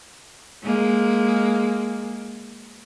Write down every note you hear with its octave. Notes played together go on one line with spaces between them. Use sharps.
G#3 A#3